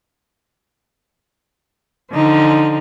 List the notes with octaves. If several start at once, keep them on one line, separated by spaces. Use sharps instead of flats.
D3 F3 D#4